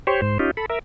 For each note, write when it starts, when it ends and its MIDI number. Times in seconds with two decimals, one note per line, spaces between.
0.07 0.21 67
0.07 0.21 72
0.07 0.21 73
0.22 0.38 44
0.22 0.38 72
0.39 0.51 61
0.39 0.51 63
0.39 0.51 65
0.39 0.51 67
0.57 0.66 69
0.57 0.66 83
0.70 0.79 70
0.70 0.79 76